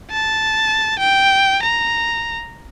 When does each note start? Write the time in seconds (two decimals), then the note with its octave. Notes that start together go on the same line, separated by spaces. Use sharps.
0.11 A5
0.99 G5
1.63 A#5